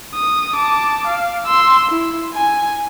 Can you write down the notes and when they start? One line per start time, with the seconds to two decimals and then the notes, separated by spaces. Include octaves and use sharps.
0.15 D#6
0.56 A5 D6
1.07 F5
1.47 C6 E6
1.91 E4
2.34 G#5